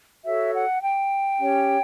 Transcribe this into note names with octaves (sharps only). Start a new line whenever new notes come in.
F#4 A4 C#5 E5
F#5
G5
C#4 G4 C#5